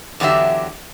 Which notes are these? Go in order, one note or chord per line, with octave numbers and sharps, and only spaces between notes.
E2 D3 F#3 G4 E5